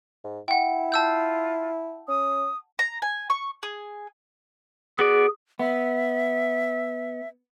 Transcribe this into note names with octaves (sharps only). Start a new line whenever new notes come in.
G#2
E4 F#5 G5
F4 A5 E6 G6
C#4 D#6
A#5
G#5
C#6
G#4
B3 F#4 G#4 D5
B3 E5